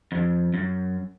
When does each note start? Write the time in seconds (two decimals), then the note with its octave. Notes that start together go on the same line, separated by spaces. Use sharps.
0.12 F2
0.54 F#2